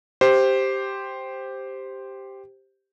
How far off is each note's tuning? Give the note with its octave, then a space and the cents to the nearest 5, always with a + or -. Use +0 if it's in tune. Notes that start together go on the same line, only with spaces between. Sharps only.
G4 +0 C5 +0